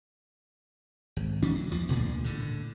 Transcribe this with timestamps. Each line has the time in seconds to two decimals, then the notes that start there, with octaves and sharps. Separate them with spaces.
1.16 G#1
1.42 D#3 C#4 D4
1.56 F#3
1.71 E2 F3
1.89 G1 D2 A#2 D3
2.24 A2 D3